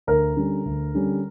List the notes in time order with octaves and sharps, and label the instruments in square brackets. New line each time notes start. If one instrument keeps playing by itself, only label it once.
[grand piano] D2 [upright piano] A#4
[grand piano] D3 G3 C#4
D2
D3 G3 C#4